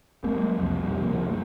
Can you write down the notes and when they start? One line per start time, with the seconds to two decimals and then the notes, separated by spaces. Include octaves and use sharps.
0.24 G3 G#3 A#3 C4
0.38 F#3 G#3 A#3
0.58 C2 F2
0.83 F2 A#2 G3
1.01 C#2 C3 F3 A#3
1.29 G2 A3